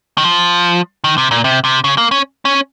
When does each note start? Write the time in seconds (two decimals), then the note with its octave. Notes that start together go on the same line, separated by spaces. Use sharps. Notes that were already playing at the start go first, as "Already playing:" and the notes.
0.18 D#3
0.24 F3
1.04 D#3
1.18 C3
1.31 A#2
1.44 C3
1.64 C3
1.84 C#3
1.98 A#3
2.11 C#4
2.45 C#4